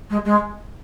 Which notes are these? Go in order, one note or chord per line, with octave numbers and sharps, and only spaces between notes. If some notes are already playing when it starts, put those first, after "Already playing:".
G#3
G#3